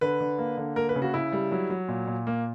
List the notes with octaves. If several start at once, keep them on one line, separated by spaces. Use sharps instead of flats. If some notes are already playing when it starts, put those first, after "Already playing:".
D3 B4
D3
A#3
D3
A#3 A#4
B4
C#3
F#4
C#3 E4
G3
F#3
F#3
A#2
A#2
A#3